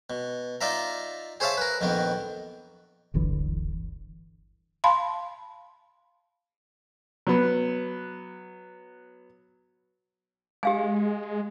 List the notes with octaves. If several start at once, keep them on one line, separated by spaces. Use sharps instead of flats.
B2
D#4 F4 D5 E5 A#5
G#4 C5 C#5 E5 F5 A5
A#4 B4
A#1 F2 D#3 B3
D1 G1 D3 E3
F5 A5 B5 C6
F#3 B3
G#3 G4 F5 G#5